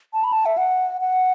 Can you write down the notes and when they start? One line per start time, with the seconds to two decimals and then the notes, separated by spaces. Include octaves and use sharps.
0.13 A5
0.24 B5
0.33 A5
0.46 E5
0.58 F#5
1.01 F#5